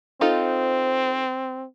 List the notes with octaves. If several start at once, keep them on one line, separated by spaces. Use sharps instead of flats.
C4 D#4 F4 A4 C5